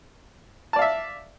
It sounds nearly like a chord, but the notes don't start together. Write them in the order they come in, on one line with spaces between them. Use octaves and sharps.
A5 D5 F5 E5